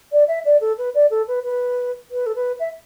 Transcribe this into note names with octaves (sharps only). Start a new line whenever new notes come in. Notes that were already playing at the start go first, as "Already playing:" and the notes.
D5
E5
D5
A4
B4
D5
A4
B4
B4
B4
A4
B4
E5